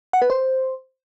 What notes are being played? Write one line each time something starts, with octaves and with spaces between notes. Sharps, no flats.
F#5
B4
C5